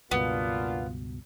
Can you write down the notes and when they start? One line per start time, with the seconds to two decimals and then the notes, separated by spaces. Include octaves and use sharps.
0.11 C#2 G2 B2 A#3 B3 D4 F4